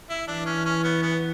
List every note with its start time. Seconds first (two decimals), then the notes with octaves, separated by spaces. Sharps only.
0.10 E4
0.28 E3 D4
0.46 C#4
0.65 C#4
0.84 B3
1.02 B3